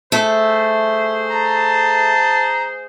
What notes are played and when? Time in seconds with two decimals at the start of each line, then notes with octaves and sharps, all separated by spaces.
0.12 A3 G#4 C5
1.29 A5 A#5